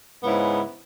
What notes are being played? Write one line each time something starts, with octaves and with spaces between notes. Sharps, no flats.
G#2 C#3 B3 E4